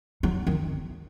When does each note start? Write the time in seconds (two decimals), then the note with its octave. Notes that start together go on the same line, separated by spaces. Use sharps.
0.23 F#3
0.47 D#3